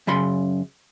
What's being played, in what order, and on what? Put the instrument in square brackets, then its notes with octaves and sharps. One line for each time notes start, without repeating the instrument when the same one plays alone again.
[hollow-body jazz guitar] F#2 C#3 B5 C6